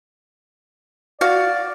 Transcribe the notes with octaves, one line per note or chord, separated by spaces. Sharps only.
F#4 D5 F5